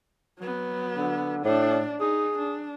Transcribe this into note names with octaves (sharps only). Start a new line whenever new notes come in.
F#3 B3
D3
A2 D4 D5
D#4 G#4
D4